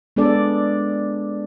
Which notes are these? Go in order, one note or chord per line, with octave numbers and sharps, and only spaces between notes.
G#3 B3 D4 A4 D5